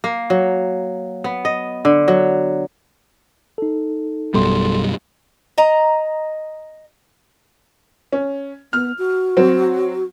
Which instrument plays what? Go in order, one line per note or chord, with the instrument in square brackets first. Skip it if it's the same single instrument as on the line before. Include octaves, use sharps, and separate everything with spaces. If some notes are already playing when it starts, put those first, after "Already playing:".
[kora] A#3
F#3
B3
D#5
D3
F#3
[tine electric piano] D#4 A4
[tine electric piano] A1 A4 C6 [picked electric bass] F#2 B2 G3
[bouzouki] D#5 A#5
[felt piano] C#4
[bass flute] B3 [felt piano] F6
[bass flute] F#4
[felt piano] F#3 C4